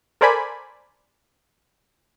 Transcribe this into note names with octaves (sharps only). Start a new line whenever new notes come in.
A4 A#4 C5 D5 G#5 B5